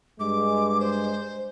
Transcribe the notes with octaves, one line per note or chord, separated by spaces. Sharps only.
G2 G#3 D6
C5